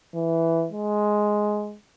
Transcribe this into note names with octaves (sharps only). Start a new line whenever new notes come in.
E3
G#3